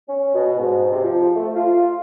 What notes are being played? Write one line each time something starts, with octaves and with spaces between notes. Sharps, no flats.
C#4
B2
G#2
C3
F3
A3
F4